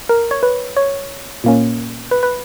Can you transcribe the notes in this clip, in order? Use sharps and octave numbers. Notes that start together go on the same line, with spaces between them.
A#4
C#5
B4
C#5
A#2 A#3 C#4
B4
B4